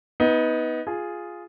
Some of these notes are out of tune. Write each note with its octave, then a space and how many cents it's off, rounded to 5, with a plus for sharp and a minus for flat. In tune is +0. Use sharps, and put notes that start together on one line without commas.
B3 +0 D#4 +25
F4 +0 G#4 +0